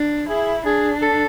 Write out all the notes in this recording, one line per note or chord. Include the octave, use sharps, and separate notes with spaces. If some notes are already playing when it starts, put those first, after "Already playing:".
Already playing: D4
E4 G#4
D4 G#4
A4